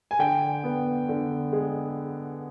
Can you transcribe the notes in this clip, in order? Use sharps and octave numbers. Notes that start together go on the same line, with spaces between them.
G#5
D3 G5
B3
D3
G#3